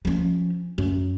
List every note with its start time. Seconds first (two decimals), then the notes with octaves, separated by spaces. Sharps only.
0.05 F3 C#4
0.78 F#2